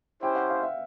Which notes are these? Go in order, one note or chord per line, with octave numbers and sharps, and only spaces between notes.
C#4 E4 G4 C5 G5
F#5
F5
E5